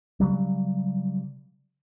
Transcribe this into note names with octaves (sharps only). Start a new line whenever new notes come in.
C#3 F#3 G3